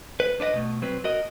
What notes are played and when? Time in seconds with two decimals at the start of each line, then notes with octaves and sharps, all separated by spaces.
0.20 B4
0.40 D4 B4 D5 D#5
0.54 B2 A3
0.82 F#3 C4 B4
1.04 F#4 A#4 D#5